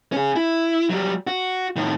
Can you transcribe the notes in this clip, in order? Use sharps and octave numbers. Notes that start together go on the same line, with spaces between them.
C#4 G#4
E4
F#3 G3
F#4
A2 D#3